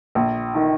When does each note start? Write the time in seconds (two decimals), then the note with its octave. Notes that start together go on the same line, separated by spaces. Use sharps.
0.15 A#1
0.55 D#3